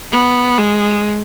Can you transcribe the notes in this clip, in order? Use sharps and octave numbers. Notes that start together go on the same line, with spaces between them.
B3
G#3